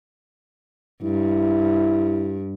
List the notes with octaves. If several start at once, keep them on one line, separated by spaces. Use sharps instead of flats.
G2 E4